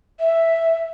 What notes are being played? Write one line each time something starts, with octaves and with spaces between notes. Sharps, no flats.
E5